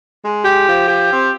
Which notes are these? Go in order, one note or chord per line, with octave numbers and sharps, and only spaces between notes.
G#3
G4
F3
G4
C4